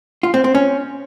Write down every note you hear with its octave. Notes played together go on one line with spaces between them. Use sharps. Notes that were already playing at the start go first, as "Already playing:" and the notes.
F4
C4
C4
C#4